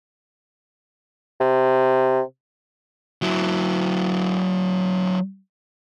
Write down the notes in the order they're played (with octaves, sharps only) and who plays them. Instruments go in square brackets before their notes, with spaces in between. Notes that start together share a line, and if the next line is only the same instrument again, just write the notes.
[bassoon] C3
[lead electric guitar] F#3 E4